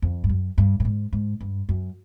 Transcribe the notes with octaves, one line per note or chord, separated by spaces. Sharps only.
F2
G2
F#2
G2
A2
G#2
G#2
G2
F#2